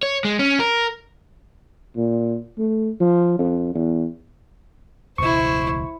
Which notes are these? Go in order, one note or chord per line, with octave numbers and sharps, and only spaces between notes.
C#5
G#3
C#4
A#4
A#2
A3
F3
F2
E2
E1 C#2 B2 E4 C5 C#6